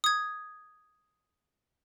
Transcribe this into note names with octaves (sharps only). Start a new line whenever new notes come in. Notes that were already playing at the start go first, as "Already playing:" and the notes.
D#6 G#6